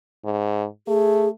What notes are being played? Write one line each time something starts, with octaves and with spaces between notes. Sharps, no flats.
G#2
A3 G#4